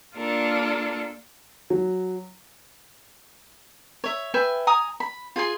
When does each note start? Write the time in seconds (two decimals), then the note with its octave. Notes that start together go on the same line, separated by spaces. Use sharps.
0.16 A#3 D4 F4 A4 A#4
1.70 F#3
4.04 C#5 E5
4.34 B4 E5 G5 G#5
4.67 G#5 A#5 D#6
5.00 B5
5.36 F4 G#4 G#5 C6